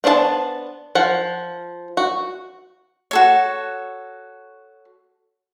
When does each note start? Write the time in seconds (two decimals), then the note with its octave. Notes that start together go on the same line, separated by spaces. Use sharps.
0.04 B3 D4 C5 D5 A5
0.95 F3 F#5
1.97 F#4
3.11 F#4 A4 C#5